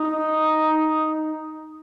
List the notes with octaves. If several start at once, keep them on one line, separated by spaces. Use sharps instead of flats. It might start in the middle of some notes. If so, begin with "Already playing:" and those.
Already playing: D#4